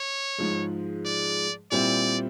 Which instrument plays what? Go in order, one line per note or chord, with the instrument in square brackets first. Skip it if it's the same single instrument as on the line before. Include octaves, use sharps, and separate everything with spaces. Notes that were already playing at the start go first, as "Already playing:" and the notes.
Already playing: [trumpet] C#5
[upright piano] G#2 F3 G#3
[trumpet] D5
[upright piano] A#2 G3 C4 E4 [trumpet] D5